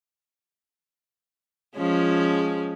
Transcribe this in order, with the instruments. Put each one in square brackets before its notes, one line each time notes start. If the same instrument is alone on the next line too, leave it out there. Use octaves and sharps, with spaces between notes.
[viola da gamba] F3 G#3 C#4